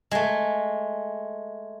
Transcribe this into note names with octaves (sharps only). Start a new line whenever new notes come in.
G#3 A3